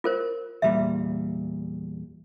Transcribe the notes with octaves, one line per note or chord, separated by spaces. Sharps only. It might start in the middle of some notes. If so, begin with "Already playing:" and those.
F4 A#4 C5
E2 A#2 G3 E5